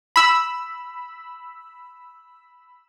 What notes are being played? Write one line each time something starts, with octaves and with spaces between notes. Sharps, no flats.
B5 E6